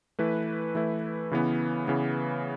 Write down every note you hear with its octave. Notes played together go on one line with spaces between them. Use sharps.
E3 A3 E4 B4
E3 A3 E4 B4
C#3 E3 B3
C#3 E3 B3